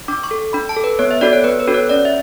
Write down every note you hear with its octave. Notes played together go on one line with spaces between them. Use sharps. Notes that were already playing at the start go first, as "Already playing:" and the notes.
D4 D6
C#6
A4
D4 B5
A5
A4
B4
B3 C#5
E5
D4 F#4 A4 D5
C#5
B3 B4
B4
D4 F#4 A4
C#5
C#4 D5
E5